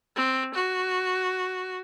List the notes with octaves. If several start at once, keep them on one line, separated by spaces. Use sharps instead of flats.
C4
F#4